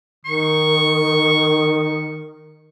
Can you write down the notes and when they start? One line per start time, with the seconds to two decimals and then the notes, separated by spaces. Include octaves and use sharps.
0.25 D#3 C#6